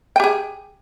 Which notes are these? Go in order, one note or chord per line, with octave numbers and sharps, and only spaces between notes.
G4 G#4 G5